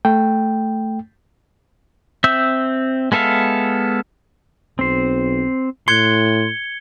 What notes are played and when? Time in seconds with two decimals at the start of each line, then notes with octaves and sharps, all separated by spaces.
0.05 A3 G5
2.24 C4 E5 E6 G6
3.12 G#3 B3 A4 E5 F5
4.79 B1 C4 C5
5.88 A2 C6 F#6 G#6 C#7 G7